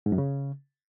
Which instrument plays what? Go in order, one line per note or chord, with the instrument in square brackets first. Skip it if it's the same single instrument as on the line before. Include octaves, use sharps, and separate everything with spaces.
[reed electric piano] G#2
F#2
C#3